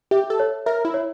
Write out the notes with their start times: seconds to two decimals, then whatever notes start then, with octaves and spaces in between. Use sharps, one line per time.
0.11 G4 E5
0.30 A4
0.40 C#5
0.66 A#4 E5
0.85 E4
0.94 C#5